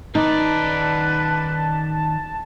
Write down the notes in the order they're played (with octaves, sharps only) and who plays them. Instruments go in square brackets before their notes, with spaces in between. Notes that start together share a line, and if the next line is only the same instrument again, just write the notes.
[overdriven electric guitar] D#3 D5 [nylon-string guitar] D#4 [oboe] B4 [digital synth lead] A5